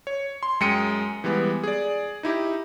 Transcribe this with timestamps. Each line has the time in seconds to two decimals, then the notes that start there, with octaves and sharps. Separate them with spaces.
0.07 C#5
0.43 C6
0.60 F#2 G#3 G5 C#7 D#7
1.24 E3 G3 G#3 B3
1.64 G#4 D5
2.23 D#4 E4 G4